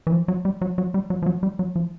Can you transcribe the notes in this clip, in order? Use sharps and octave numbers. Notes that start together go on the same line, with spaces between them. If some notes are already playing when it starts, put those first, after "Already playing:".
E3
F3
F#3
G3
F#3
F#3
G3
F#3
F3
F#3
G3
F#3
F3